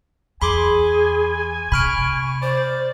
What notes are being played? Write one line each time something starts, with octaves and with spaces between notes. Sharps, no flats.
E2 G#4 G#5 B5 C6 D6
C3 B5 C#6 F6 D7
C5 D5